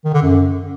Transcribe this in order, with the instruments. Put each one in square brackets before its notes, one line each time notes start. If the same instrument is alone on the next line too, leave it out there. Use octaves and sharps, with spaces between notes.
[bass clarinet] D#3
D3
F#2